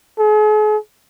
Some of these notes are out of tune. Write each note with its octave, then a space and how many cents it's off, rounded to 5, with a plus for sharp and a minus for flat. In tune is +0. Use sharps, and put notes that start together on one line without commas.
G#4 +45